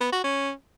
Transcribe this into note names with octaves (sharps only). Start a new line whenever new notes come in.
B3
F#4
C#4